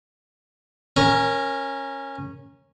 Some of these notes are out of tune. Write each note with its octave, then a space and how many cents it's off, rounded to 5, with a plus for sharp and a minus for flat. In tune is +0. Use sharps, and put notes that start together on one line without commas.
C#4 -15 A#4 +5